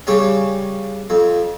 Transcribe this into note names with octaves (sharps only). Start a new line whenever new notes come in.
C#3 G3 C#4
F2